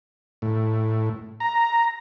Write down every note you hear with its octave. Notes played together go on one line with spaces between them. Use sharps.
A2
A#5